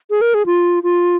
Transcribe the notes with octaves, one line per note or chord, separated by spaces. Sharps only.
G#4
A#4
G#4
F4
F4